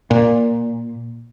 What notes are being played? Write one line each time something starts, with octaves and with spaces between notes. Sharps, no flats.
A#2